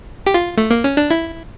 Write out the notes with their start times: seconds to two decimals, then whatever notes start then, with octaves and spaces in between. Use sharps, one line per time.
0.26 G4
0.34 F4
0.58 A3
0.71 A#3
0.84 C#4
0.97 D4
1.10 E4